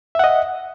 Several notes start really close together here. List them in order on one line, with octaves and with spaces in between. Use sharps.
E5 F#5 D#5